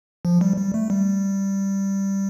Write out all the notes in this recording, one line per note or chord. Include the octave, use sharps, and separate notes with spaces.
F3
G3
G3
A3
G3